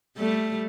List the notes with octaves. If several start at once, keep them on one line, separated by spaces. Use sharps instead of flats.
G3 A3